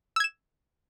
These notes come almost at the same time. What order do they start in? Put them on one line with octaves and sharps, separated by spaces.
E6 G#6 E7